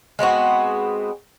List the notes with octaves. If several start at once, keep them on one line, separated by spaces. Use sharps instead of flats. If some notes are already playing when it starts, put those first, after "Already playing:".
G#3 B3 C4 F#4